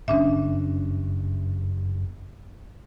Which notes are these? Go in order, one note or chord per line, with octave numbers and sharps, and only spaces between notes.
F#1 G2 C#4 D4 E5